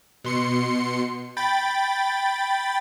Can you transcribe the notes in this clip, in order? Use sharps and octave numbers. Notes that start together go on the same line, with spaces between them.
B2 C6 C#7
G5 B5 A6